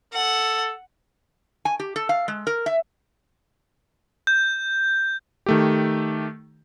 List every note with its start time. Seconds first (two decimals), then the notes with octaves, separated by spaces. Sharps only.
0.14 A4 F#5
1.65 G#5
1.80 G4
1.96 A4
2.09 F5
2.28 G#3
2.47 A#4
2.66 E5
4.27 G6
5.46 D#3 A3 G4